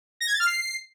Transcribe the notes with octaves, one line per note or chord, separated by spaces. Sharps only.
A#6
G#6
A6
F6
C7